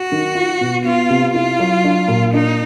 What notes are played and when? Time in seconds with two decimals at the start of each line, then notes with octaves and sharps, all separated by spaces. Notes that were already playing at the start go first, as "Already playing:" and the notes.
Already playing: F#4
0.12 D#3
0.35 F4
0.61 B2
0.85 B3 F4
1.10 C3
1.34 E4 F4
1.59 F#3
1.84 D4
2.08 A#2
2.33 D4 D#4